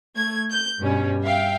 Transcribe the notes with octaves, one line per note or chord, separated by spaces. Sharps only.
A3 G#6
G6
G2 B2 G3 C#4
E5 F5 G5